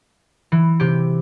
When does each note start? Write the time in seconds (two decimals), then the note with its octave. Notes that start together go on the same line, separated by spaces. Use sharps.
0.52 E3
0.80 C3 G4